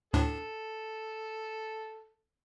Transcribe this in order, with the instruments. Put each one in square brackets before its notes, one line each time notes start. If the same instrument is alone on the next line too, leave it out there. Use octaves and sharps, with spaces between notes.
[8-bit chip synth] D2 A2 D4 [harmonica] A4